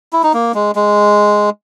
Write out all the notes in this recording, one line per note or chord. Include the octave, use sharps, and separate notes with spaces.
E4
D#4
A#3
G#3
G#3